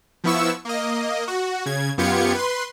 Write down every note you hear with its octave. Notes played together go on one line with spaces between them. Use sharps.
F3 B3 E4 C#6 E6
A#3 D#5
F#4
C#3 G#6
F#2 B3 F4 G4 G#6 C#7
B4 C6